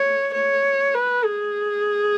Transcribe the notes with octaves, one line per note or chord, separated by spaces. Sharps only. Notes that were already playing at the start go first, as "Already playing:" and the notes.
Already playing: C#5
C#5
B4
G#4